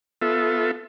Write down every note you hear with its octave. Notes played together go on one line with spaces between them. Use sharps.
B3 F4 A4 E5